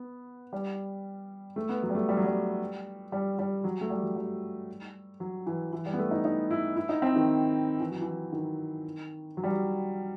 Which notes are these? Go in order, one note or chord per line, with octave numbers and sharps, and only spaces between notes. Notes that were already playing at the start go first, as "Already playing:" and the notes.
Already playing: B3
G3
A3
B3
F#3
G3
A3
G3
F#3
G3
G3
G3
F#3
A3
G3
F#3
G3
F#3
E3
E3
G3
B3
A3
D#4
D#4
E4
E4
D#4
C4
D#3
E3
F#3
E3
D#3
F#3
G3
F#3